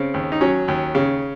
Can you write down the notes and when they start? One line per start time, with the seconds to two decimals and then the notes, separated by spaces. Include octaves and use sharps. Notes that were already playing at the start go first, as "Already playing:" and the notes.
Already playing: C#3 C4
0.14 D#2
0.32 D#4
0.41 F#3 C#4
0.68 D#2
0.95 C#3